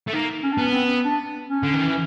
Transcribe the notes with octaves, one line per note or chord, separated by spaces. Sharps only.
A3
A#3 D#4
C#4
D4
B3 C#4
C4
D4
C#4
D3
D#3
E3